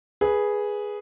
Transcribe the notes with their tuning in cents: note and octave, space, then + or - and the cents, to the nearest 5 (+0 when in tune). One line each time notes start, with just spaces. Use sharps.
G#4 +0 B4 -10